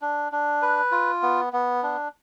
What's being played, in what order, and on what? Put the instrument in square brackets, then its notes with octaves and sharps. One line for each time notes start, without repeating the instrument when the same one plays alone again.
[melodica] D4
D4
B4
F4
B3
B3
D4